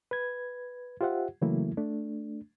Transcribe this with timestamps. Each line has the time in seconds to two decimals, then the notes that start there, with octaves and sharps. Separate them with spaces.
0.11 B4 G#6
1.01 F4 G4 C5 E5 F#5
1.42 C#3 E3 F#3 A3 A#3 E4
1.77 A3 D4